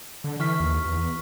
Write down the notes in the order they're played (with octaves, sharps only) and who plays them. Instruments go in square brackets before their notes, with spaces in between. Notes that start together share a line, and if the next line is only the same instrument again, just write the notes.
[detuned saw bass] D3
[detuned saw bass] E3 [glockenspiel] C#6 F6 B6
[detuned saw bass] D#2
E2